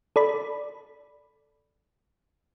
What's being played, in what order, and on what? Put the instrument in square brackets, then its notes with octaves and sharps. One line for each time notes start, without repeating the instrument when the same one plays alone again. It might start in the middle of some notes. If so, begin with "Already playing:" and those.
[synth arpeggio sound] A4 D5 B5